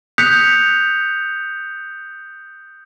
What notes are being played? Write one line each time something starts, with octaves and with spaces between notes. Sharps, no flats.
D#6 F#6 G6 B6 C#7 F7